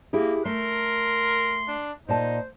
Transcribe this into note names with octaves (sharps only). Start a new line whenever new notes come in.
A#3 E4 G4 G#4
A3 A#4 C6
D4
A#2 D#4 C5 A5